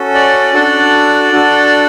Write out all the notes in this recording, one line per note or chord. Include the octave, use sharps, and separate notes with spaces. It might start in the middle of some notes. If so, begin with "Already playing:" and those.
Already playing: C#4 F#4 A4
D5
D4 F#4 A4
D4 F#4 A4